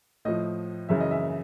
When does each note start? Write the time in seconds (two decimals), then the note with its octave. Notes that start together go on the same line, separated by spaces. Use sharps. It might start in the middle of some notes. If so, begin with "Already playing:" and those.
0.25 A2 F3 D#5
0.89 F#2 C#3 E3 E5
1.00 D#5
1.11 E5